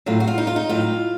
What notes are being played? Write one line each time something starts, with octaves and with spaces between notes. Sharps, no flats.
A2 F#3 F4
F#4
F4
D#4
F4
D#4
A2 F#3 F4